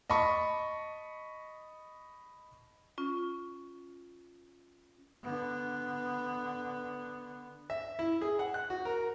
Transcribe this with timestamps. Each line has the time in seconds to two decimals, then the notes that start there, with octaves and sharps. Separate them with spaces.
0.10 D#5 A5 B5 C#6
2.98 C#4 F4
5.23 D3 B3
7.70 E5
7.99 E4
8.21 G#4
8.39 F#5
8.54 F#6
8.70 F#4
8.85 A#4